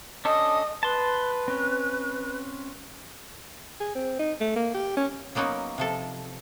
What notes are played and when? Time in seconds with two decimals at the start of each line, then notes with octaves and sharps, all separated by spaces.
0.25 C#4 D4 A4 D#5
0.83 B4 A5 C6
1.48 C4 C#4
3.81 G#4
3.96 C4
4.19 D#4
4.41 A3
4.56 A#3
4.75 G4
4.97 C#4
5.35 F#3 A#3 B3 C#4 D#4
5.78 C3 F3 A4